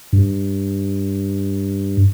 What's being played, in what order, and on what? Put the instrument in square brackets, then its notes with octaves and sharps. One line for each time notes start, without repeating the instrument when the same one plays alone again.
[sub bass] G2